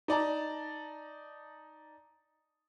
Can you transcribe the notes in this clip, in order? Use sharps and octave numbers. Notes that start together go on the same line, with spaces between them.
D#4 D5 A5 A#5